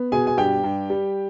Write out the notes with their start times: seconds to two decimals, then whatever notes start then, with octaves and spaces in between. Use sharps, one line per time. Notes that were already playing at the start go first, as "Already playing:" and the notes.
Already playing: B3
0.12 B2 G#4 G#5
0.27 G#5
0.38 G2 G4 G5
0.64 G2
0.90 G3